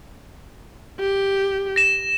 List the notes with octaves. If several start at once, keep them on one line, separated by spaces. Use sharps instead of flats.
G4
A#6 E7